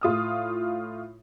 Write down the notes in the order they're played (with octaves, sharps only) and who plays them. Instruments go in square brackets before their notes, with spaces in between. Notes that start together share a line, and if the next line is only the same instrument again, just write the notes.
[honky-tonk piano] A2 F4 D#6 F6